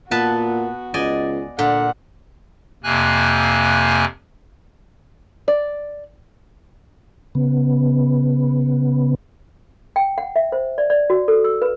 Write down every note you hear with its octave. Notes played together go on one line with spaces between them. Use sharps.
A#2 B3 F#4 B4 A5
C#2 D5 D#5 G#5
A#2 D3 F#5
F2 C3 A#3 G#5 F#6
D5
C#3 B3
G5
F#5
E5
C5
D5
D5
F#4
A4
E6
B4